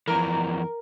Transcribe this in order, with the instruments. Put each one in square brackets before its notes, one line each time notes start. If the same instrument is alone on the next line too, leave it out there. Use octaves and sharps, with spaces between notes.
[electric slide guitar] F2 E3 [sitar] A#4 [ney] A#5